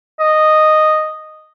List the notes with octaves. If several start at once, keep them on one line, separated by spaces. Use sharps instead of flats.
D#5